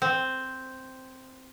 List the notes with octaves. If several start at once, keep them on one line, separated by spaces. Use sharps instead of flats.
C4